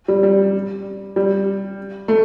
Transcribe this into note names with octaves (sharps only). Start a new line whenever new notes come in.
G3
G3
G3
A3